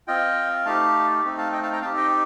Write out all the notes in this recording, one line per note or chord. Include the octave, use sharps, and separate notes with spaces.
C4 F4 D#5 G5
A3 D#4 G4 F5 A5
A3 C4 D#4
F5 A5
D#5 G5
F5 A5
G5 A#5
C4 D#4 G4 F5 A5
D#5 G5